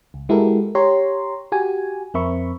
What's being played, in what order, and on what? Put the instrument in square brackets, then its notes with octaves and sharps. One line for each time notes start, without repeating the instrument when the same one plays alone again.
[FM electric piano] C#2
G#3 E4 F#4 G4 A4 A#4
G4 C#5 A#5 C6
F#4 G4 G#5
F2 C4 A#4 E5 B5 C#6